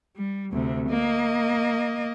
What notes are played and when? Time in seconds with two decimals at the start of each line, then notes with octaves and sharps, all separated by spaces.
0.16 G3
0.52 D2 C3
0.89 A#3 D#5